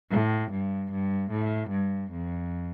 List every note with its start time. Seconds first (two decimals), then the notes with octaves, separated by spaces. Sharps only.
0.12 A2
0.51 G2
0.92 G2
1.31 A2
1.71 G2
2.11 F2